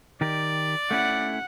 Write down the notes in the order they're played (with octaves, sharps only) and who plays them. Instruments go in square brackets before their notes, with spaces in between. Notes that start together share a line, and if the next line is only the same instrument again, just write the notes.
[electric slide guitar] D#3 G4 A#4 [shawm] D5
[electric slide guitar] A3 C#4 E4 [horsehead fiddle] F#5